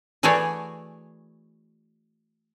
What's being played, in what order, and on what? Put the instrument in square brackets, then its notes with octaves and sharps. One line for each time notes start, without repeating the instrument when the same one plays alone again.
[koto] E3 A3 F#4 G#4 C#5 D5